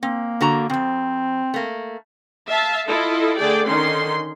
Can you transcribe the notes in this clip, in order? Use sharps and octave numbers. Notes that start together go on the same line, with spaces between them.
A#3 C4
D3 F#4 A#5
F2 B2 C4
A3 A#3
E5 F5 A5
E4 F4 A4 D#5
D3 A3 G#4 D5 G5
D3 D#3 C#4 D#4 C6